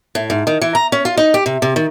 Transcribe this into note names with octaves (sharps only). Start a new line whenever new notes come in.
A2
G#2
D#3
E3
A#5
C#4
F4
D#4
G4
C3
C3
D#3